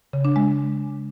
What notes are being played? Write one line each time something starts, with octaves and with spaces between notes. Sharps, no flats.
C#3
D4
G#3